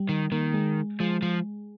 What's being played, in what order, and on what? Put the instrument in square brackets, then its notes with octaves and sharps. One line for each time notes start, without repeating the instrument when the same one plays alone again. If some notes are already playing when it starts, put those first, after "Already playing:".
Already playing: [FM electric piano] G3
[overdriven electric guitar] D#3
[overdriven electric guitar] D#3 [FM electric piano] A#3
[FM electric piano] G#3
[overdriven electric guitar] F3 [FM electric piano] G#3
[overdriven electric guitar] F3